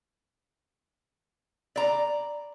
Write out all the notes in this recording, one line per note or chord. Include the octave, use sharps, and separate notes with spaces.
D5 A#5